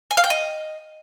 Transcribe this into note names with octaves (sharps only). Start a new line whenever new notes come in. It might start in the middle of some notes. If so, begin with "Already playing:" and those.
G#5
F5
G5
D#5